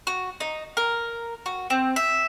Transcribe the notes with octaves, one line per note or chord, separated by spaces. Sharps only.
F#4
D#4
A#4
F#4
C4
E5